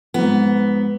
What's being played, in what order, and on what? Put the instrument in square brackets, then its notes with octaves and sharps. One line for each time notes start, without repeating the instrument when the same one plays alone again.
[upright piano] F2 G#2 [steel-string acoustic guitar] B3